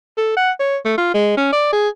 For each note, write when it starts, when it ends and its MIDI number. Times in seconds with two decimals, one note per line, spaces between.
0.18 0.34 69
0.37 0.51 78
0.60 0.77 73
0.85 0.95 57
0.98 1.12 65
1.14 1.33 56
1.37 1.51 61
1.52 1.71 74
1.73 1.89 68